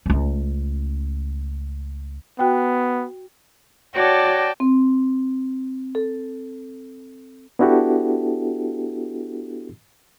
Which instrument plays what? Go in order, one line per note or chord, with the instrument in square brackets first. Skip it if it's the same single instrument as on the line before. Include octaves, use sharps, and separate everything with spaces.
[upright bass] C#2 A3
[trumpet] B3 [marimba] F#4 G5
[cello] F#4 C#5 [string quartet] D5 G5 A5
[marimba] C4
A4
[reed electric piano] B3 D4 E4 F#4 G4 A4